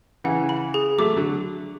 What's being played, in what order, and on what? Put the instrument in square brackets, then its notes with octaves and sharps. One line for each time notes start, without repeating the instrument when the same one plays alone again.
[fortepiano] C#3 E3 [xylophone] F#5
[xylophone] B5
G#4
[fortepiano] F#3 A3 [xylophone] D6
[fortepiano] D3 F#3